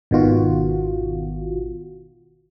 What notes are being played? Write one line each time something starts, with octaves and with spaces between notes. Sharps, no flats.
G#1 B2 D#3 F4 F#4